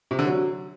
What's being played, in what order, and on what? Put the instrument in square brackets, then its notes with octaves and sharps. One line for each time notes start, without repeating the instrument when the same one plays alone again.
[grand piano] C3
D3
F#3